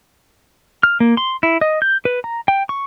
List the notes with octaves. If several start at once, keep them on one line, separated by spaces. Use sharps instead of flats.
F6
A#3
C6
E4
D#5
G6
B4
A#5
G5
C#6